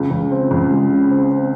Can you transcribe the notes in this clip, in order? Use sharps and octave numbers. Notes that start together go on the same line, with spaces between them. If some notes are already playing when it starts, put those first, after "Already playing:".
Already playing: C#2
C#2
C4
C#2
G#3
C#3
C4
C4